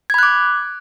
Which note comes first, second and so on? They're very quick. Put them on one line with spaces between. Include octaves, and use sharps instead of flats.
G#6 B5 F#6 D6